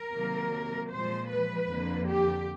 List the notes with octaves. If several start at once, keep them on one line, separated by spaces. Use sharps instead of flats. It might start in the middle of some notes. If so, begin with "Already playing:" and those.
Already playing: A#4
C3 D#3 F#3 A#3
A#2 F3 G#3 C5
B4
F2 D3 F3 A#3
G4